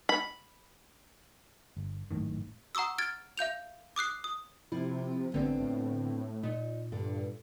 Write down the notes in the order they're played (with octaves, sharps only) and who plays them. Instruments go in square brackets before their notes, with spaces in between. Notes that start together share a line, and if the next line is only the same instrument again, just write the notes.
[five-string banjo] B5
[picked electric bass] G1
G#1 F#2 A2 D#3
[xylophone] F#5 A#5 C#6 D#6 E6
F6 G#6 A6 D7
E5 F5 G6 F7
D6 D#6 F#6 C7
D#6
[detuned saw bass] C3 [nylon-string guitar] F3 [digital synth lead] E4
[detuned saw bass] A1 [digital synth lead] D3 [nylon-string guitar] B3 C4 D4
[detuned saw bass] A2
[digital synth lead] A#2 [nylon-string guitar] D#4
[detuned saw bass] G2 [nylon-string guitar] D3